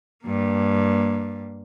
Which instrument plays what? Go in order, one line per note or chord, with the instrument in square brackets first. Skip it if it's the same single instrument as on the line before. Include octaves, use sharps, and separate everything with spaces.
[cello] G2 A#3